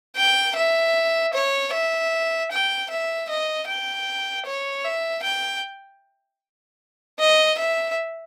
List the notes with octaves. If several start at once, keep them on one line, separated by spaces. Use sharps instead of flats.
G5
E5
C#5
E5
G5
E5
D#5
G5
C#5
E5
G5
D#5
E5